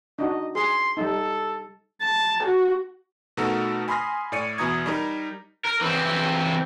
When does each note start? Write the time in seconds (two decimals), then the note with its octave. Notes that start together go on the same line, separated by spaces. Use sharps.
0.19 D4 D#4 F#4 D#5
0.55 G#4 C6
0.97 G3 D#4 A4
2.02 A5
2.43 F#4
3.37 B2 A3 D#4 F#4 A4 A#4
3.88 G#5 B5 C6 D#6 F6 A#6
4.32 A2 D5 C#7 D#7
4.58 E2 B2 E4 A#5 D#6 G#6
4.86 G3 D#4 A#4
5.65 A#4
5.81 E3 C4